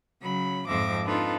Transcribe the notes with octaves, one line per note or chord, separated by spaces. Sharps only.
C#3 F#3 B5
F2 G#2 F3 E5 D6 A#6
C4 D4 D#4 F4 A4 B4